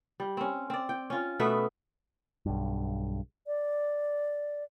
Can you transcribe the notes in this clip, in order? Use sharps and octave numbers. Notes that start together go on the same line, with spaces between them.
G3
C4 C#4
C4 D5
G5
C#4 F4
B2 A3 B3 E5
B1 G2
D5